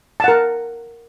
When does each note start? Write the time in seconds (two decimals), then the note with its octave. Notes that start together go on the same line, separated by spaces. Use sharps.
0.20 A5
0.24 F#5
0.28 A#4